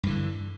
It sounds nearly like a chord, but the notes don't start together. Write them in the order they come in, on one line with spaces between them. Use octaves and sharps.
G2 E3 D3